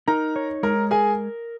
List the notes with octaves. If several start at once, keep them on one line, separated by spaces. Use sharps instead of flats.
D#4 A#4 A#5
C#5
G#3 A#4 A#5
G#4 A#4 G#5